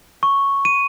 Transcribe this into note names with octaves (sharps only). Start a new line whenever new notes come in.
C#6
D#7